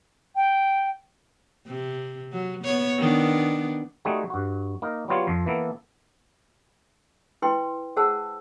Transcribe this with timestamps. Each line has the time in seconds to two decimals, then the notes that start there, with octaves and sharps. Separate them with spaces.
0.35 G5
1.67 C3
2.32 F#3
2.64 B3 C#5
2.98 D#3 B3 D4
4.05 G3 A3 C4 D#4 F#4 G#4
4.30 G2 F#4
4.82 A#3 D#4 A#4
5.08 F#3 G3 B3 F4 C#5 F5
5.27 F2 F3
5.46 E3 A#3 B3 A4
7.42 E4 B4 G5 C6
7.97 G#4 C5 F#5 A5 E6